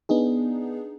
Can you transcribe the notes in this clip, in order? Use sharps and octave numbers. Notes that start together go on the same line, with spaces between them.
B3 D4 D#4 G#4